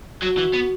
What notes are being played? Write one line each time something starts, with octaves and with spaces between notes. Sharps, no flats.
F#3 F#4
E3
B3